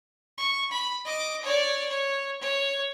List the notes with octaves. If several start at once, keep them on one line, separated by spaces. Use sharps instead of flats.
C#6
B5
D#5 D6
C#5 D5
C#5
C#5